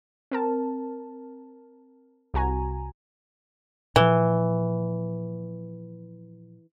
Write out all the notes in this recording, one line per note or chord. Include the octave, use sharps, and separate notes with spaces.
C4 A#4 A5
C2 F#4 G#5 A#5
A#2 E3 F3